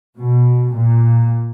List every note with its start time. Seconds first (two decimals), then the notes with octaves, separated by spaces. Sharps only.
0.17 B2
0.75 A#2